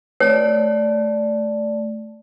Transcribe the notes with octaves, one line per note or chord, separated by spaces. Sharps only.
A3 C#5 D5